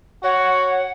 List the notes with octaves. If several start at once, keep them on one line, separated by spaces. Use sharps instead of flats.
F#4 C#5 F#5